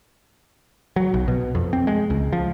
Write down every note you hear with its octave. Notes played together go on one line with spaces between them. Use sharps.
F#3
B1
B2
F2
C4
G#3
C#2
F3